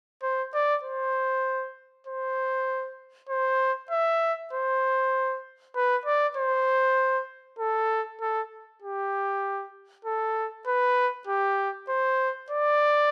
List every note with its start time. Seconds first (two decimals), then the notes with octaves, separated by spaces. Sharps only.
0.23 C5
0.54 D5
0.84 C5
2.07 C5
3.29 C5
3.91 E5
4.53 C5
5.75 B4
6.06 D5
6.37 C5
7.59 A4
8.20 A4
8.82 G4
10.05 A4
10.67 B4
11.27 G4
11.89 C5
12.50 D5